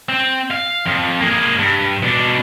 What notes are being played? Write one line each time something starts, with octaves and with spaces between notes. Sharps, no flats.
C4
F5
F2
A#3 G#4
G2
B2 D4